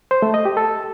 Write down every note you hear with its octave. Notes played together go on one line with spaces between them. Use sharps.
C5
A3
D#5
G4
A4